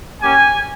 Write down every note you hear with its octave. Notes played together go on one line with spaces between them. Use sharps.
A#3 C#4 G4 G#5